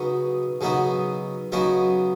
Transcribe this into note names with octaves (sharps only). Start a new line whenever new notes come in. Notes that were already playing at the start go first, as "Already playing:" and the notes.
Already playing: C#3 F#3 B3 D#4 F#4
C#3 F#3 B3 D#4 F#4
C#3 F#3 B3 D#4 F#4